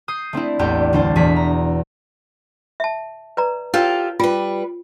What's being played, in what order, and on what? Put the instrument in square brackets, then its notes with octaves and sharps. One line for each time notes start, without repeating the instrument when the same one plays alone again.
[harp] D#6 G6 C7
A3 C4 D4 E4
A1 E2 A3 D4 G4 G6
D2 F#3 D4 C5 A5
E1 E2 G#4 B6
A#5
[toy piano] E5 A5
B4 D5 A#5
[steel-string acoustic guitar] F4 G4 A4 [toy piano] A#4 C#5
[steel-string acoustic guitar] G3 B4 [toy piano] F4